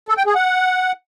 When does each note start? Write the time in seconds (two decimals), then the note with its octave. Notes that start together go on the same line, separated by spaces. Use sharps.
0.08 A4
0.17 G5
0.26 G#4
0.35 F#5